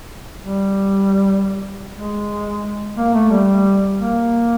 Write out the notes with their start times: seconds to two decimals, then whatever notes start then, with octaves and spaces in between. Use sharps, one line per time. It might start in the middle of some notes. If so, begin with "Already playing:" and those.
0.40 G3
1.94 G#3
2.97 A#3
3.14 A3
3.31 G3
3.99 A#3